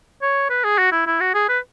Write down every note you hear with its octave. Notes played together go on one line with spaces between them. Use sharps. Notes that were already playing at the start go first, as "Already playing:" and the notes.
C#5
B4
G#4
F#4
E4
E4
F#4
G#4
B4